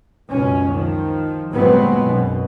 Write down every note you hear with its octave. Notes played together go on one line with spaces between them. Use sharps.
C#2 F#2 B2 C#4
D#3 F3
G1 A#2 F#3 G#3 B3 C4
B1 F#2 B2